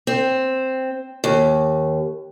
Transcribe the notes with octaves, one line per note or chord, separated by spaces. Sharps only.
C4
D#2